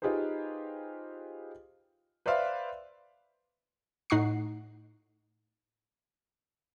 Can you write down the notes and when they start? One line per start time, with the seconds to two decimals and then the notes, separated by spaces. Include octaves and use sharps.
0.02 D#4 F4 G4 G#4 B4 C5
2.26 B4 C5 D5 E5 F5 C6
4.10 A2 D#4 F#5 C#6 C7